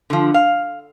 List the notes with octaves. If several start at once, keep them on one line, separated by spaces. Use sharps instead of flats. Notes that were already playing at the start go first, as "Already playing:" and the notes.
D3 F3
F5